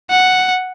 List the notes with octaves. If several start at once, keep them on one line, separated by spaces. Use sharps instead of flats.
F#5